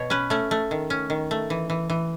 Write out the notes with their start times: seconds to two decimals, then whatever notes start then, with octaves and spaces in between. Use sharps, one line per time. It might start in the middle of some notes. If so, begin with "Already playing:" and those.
Already playing: B2 C#5
0.10 C#4 B4
0.30 A3 C#4
0.51 A3
0.71 D#3
0.90 C#4
1.10 D#3
1.31 A3
1.50 E3
1.70 E3
1.90 E3